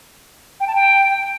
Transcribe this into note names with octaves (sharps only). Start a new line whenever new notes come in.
G5
A5
G5